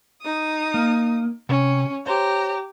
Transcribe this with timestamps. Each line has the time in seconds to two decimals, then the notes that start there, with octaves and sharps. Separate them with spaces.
0.22 D#4 D#6
0.74 A#3
1.49 C3 C#4
2.06 G4 C5 C#5 A#5